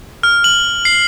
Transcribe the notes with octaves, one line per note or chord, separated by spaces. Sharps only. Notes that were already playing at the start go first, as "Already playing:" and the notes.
F6
F#7
C7